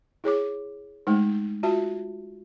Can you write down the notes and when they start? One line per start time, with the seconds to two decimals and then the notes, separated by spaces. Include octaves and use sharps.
0.24 E4 G#4 C#5 D6
1.07 G#3 A3 D#4
1.63 F4 F#4 E5 A5